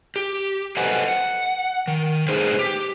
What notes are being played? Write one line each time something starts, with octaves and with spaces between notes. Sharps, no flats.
G4
A4 B4 C5 D#5 F#5 G#5
F#5
D#3
A3 D#4 G#4 B4 C5
G4